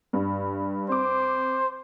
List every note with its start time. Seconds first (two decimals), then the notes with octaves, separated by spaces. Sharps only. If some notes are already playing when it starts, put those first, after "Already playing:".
0.13 G2
0.89 C4 C5 D6